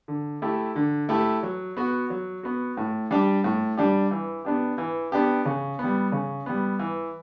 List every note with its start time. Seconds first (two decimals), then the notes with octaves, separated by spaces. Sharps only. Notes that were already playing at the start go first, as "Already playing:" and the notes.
0.08 D3
0.42 A3 E4 G4
0.76 D3
1.09 A3 E4 G4
1.43 F#3
1.77 B3 F#4
2.10 F#3
2.43 B3 F#4
2.77 A2
3.11 G3 D4 G4
3.44 A2
3.77 G3 D4 G4
4.11 E3
4.45 B3 D4 G4
4.78 E3
5.12 B3 D4 G4
5.45 C#3
5.79 G3 B3
6.12 C#3
6.46 G3 B3
6.79 E3